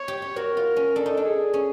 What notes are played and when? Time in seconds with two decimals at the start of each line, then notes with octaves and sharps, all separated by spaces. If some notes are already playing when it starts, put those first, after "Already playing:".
Already playing: C#5
0.08 G4
0.22 G4
0.36 F#4 A#4
0.57 F4
0.76 C#4
0.95 D4 A4
1.06 D#4
1.17 D4
1.25 G#4
1.53 C#4